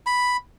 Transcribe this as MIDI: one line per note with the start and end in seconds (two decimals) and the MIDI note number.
0.06 0.37 83